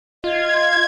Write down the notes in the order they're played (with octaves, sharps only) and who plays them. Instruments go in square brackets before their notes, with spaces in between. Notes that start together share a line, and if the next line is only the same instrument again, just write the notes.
[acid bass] F4 [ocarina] D#5 [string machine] G#6